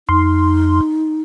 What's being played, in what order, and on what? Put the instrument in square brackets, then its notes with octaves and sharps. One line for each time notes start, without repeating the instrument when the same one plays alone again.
[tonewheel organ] F2 [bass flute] D#4 [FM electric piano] C6